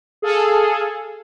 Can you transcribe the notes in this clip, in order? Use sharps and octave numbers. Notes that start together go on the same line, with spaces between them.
G#4 A4 F5